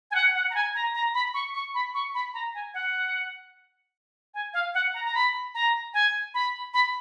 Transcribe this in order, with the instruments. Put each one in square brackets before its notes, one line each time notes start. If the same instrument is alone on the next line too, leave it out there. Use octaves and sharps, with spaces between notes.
[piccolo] G#5
F#5
F#5
A#5
G#5
A#5
A#5
B5
C#6
C#6
B5
C#6
B5
A#5
G#5
F#5
G#5
F5
F#5
A#5
A#5
B5
A#5
G#5
B5
B5